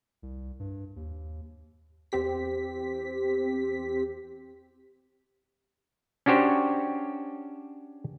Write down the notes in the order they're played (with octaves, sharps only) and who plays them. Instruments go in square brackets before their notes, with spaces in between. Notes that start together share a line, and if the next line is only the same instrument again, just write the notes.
[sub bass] C2
G2
D#2
[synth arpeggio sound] E2 C4 G4 B6
[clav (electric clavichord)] C#4 D4 F#4 G4 C5 C#5